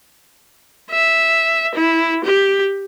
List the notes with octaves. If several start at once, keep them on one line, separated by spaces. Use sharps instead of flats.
E5
E4
G4